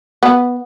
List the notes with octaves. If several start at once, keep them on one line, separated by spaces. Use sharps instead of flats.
B3